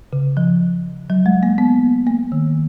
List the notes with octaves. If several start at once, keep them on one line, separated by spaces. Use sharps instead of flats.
C#3
F3
F#3
G#3
A#3
B3
A#3
D#3